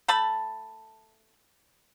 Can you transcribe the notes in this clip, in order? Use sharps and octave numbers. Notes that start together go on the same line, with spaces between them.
A3 A5 B5